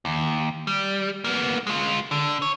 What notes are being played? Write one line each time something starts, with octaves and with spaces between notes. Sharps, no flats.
D#2
G3
A#3 B3
G#3 F4
D3
C#5